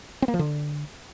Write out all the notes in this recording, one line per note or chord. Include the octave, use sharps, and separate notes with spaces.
C4
A#3
F3
D3